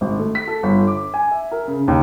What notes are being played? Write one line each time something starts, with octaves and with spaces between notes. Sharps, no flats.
G#1
A3
B6
A4
G1
D6
G#5
E5
A#4
C#3
D#2